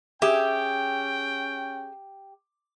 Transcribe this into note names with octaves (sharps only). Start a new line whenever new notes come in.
C#4 G4 G#4 E5 G5